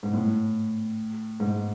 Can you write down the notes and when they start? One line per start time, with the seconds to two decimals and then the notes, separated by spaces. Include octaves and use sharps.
0.03 G#2
0.13 A2
1.40 G#2